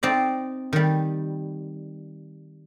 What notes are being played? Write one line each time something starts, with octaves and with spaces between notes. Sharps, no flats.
C4 D#4 D5
D#3 G3